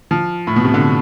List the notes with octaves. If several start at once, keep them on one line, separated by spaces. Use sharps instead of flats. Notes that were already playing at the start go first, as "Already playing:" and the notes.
F3
A2
B2
C3
D3